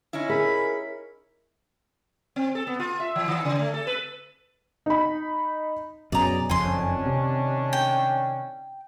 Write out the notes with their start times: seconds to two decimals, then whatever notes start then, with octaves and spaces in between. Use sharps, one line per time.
0.13 D3 C#4 D#4 E4
0.29 G#4 A#4 B5
2.36 C4
2.55 A4
2.67 B3
2.79 F4
3.00 E5
3.16 E3
3.28 D#3
3.45 C#3
3.59 A3
3.74 A4
3.87 B4
4.86 D#4 B5
6.12 F#2 B2 C#4 G#4 D5 D#5 A#5
6.50 F#1 F2 D#3 C#4 D4 G#5 C6
7.06 C3
7.73 G5